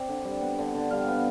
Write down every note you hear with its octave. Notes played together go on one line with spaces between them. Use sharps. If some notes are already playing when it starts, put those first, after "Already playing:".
Already playing: C4 D5
D3
G3
B3
D3
D3
G3 F5
B3